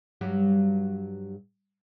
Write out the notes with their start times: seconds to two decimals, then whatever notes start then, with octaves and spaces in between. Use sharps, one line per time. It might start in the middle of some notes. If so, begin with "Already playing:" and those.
0.21 G2 F#3 G4